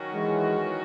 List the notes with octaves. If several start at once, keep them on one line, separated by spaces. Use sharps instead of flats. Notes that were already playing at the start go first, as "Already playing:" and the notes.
Already playing: D#3 F#3 C#4 F#4
E3 G#3